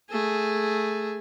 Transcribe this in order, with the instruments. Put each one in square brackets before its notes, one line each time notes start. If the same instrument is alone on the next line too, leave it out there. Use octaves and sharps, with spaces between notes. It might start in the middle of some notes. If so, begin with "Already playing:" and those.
[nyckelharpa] A3 G#4